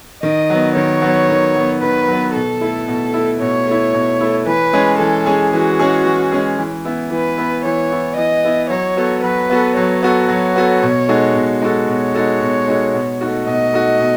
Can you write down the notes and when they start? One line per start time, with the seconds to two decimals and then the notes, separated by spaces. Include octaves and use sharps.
0.23 D#3 D#5
0.50 F#3 B3
0.76 D#3 C#5
1.02 F#3 B3
1.29 D#3
1.56 F#3 B3
1.82 D#3 B4
2.08 F#3 B3
2.34 B2 A4
2.61 A3 E4
2.88 B2
3.14 A3 E4
3.40 B2 C#5
3.67 A3 E4
3.94 B2
4.21 A3 E4
4.46 E3 B4
4.73 G#3 C#4 G#4
4.99 E3 A4
5.26 G#3 C#4 G#4
5.53 E3 F#4
5.79 G#3 C#4 G#4
6.06 E3
6.32 G#3 C#4 G#4
6.58 E3
6.85 B3 E4
7.11 E3 B4
7.38 B3 E4
7.65 E3 C#5
7.91 B3 E4
8.17 E3 D#5
8.44 B3 E4
8.70 F#3 C#5
8.97 B3 F#4 A4
9.24 F#3 B4
9.50 B3 F#4 A4
9.76 F#3 C#5
10.02 B3 F#4 A4
10.29 F#3 C#5
10.56 B3 F#4 A4
10.82 B2
11.08 G#3 D#4 F#4 A4
11.35 B2
11.61 G#3 D#4 F#4 A4
11.88 B2 C#5
12.14 G#3 D#4 F#4 A4
12.41 B2
12.68 G#3 D#4 F#4 A4
12.94 B2
13.21 A3 D#4 F#4
13.47 B2 D#5
13.73 A3 D#4 F#4
14.00 B2